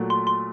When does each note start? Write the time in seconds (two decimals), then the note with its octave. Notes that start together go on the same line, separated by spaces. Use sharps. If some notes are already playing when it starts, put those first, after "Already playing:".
Already playing: A#2 F#3 A3
0.10 C6
0.27 C6